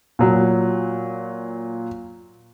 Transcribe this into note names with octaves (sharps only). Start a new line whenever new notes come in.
A#2 F#3